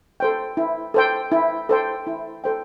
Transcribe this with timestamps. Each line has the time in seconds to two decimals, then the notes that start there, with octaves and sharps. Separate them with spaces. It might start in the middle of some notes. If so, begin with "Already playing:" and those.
0.20 A4 C5 G5
0.57 E4
0.94 A4 C5 G5
1.32 E4
1.69 A4 C5 G5
2.07 E4
2.44 A4 C5 G5